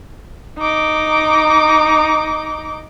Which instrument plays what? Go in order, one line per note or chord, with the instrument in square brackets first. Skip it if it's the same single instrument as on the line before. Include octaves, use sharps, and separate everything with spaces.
[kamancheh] D#4 D6